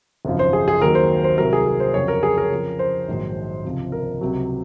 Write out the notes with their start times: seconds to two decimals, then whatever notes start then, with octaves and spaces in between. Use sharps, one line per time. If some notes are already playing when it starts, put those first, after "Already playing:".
0.25 G#1 F#2 C#3 F3
0.39 C5
0.53 G#4
0.68 G#4
0.81 D#2 D#3 F#3 A#4
0.95 C5
1.24 C5
1.38 C2 C3 F#3 A#4
1.53 G#4
1.66 A#4
1.80 C5
1.94 F2 C#3 F#3 C#5
2.08 A#4
2.23 G#4
2.38 A#4
2.52 F2 C#3 F3
2.79 C5
3.08 A#1 G#2 D#3 F#3
3.64 C#2 C3 F3
3.92 A#4
4.21 C#2 C3 F#3